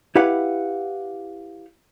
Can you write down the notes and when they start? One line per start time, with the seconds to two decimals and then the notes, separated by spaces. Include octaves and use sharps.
0.15 E4 G4 B4 F5 F#5